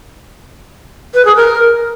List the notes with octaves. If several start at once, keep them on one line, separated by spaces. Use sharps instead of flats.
B4
G#4
A#4